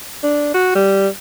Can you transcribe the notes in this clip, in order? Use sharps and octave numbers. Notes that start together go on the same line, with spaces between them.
D4
F#4
G3